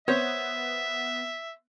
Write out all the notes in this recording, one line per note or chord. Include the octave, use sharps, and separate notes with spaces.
B3 C5 C#5 E5